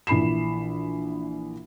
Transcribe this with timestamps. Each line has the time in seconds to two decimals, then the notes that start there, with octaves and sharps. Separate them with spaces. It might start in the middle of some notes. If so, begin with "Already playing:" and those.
0.07 A#1 E3 B5 C7 E7